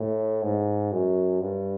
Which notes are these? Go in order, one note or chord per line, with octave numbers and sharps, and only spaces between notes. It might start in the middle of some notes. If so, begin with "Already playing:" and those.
Already playing: A2
G#2
F#2
G2